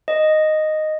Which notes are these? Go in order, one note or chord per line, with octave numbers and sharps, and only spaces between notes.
D#5